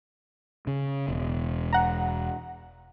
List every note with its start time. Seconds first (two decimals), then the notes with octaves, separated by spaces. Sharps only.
0.67 C#3
1.08 E1
1.73 F#5 A#5